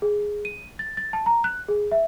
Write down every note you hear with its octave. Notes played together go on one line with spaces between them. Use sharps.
G#4
D#7
A6
A6
A5
A#5
F#6
G#4
E5